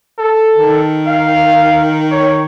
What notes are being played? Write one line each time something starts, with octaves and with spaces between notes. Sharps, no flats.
A4
D#3
F5
C#5